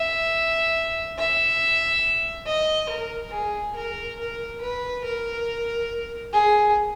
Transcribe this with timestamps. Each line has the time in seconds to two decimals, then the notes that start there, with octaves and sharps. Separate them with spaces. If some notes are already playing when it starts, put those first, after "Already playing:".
Already playing: E5
1.19 E5
2.47 D#5
2.89 A#4
3.33 G#4
3.76 A#4
4.19 A#4
4.61 B4
5.04 A#4
6.32 G#4